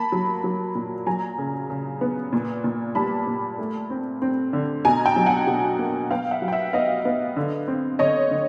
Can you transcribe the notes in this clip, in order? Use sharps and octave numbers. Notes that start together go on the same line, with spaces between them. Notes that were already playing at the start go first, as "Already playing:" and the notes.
Already playing: A#3 A5 B5
F#3
F#3
A#2
F#3 G#5 A#5
C#3
C#3
B3
A#2
A#2
G3 A5 B5
A#2
A3
C4
C4
D3
B2 G#5 A#5
G5 A5
F#3
F#5 G#5
B2
A#3
B3 F5 G5
E5 F#5
F#3
G5
E5 F#5
B3 D#5 F5
B3
D3
C4
D3 C#5 D#5
D3